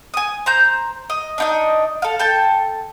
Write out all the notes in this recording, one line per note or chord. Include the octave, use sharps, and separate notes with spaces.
G#5 D#6
C5 A#5 G6
D#5
D4 D#4 D#5
A4 F5
A4 G5 A5